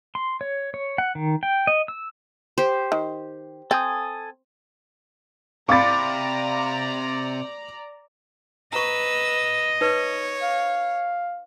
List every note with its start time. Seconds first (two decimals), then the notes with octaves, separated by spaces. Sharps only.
0.15 C6
0.41 C#5
0.74 C#5
0.98 F#5
1.15 D#3
1.43 G5
1.67 D#5
1.88 E6
2.58 G4 C5
2.92 D#3
3.71 C4 A4 G#5 D#6
5.69 C3 D5 F5 A#5 B5 D6 A6
8.73 B4 D#5 A#5 C#6 E6
9.81 D#4 B4 C#5
10.41 F5